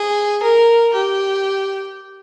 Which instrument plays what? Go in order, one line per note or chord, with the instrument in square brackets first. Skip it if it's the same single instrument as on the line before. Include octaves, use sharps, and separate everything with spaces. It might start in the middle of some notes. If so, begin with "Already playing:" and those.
Already playing: [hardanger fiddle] G#4
A#4
G4